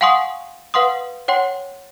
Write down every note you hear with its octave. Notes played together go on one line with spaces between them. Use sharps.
F5 F#5 G#5 C6 C#6 D#6
B4 F5 F#5 C6 D#6
C#5 F#5 G5 C6